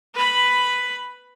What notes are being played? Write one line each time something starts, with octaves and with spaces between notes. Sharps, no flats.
B4 B5